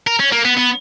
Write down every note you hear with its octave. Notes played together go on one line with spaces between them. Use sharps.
A#4
C#4
A#3
B3
B3